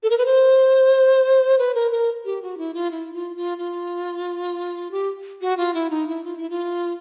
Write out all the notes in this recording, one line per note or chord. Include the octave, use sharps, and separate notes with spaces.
A4
A#4
B4
C5
B4
A#4
A#4
G4
F#4
E4
F4
E4
F4
F4
F4
G4
F#4
F4
E4
D#4
E4
F4
E4
F4